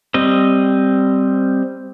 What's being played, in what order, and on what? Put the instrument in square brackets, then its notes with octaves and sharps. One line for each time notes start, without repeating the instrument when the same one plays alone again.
[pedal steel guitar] G3 C4 D#5